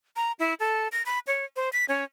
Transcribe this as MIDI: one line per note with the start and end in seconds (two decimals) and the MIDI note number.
0.16 0.32 82
0.39 0.54 64
0.60 0.88 69
0.92 1.03 94
1.06 1.19 83
1.27 1.45 73
1.56 1.69 72
1.73 1.85 95
1.89 2.04 61